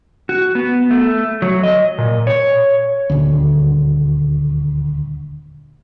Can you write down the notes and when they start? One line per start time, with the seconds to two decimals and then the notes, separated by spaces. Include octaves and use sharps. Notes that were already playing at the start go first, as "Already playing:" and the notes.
0.29 F#4
0.55 B3
0.91 A3
1.42 F#3
1.63 D#5
1.98 A#2
2.27 C#5
3.10 D#1 D2